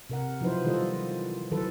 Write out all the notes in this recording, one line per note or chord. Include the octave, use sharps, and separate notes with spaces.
C3 A#4 F#5
F3 F#3 D#4 E4 B4 C5
D#3 E3 G3 F4 A4 D#5
D#3 E3 F#3 A4 B4